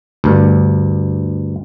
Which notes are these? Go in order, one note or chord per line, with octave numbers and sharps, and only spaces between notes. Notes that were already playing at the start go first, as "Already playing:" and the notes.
D2 G2